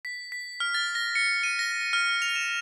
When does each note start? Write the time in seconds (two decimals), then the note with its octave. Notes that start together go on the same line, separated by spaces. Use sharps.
0.05 B6
0.32 B6
0.60 F6
0.74 A6
0.95 A#6
1.15 C#7
1.43 D#7
1.59 A#6
1.93 F6
2.22 F7
2.35 E7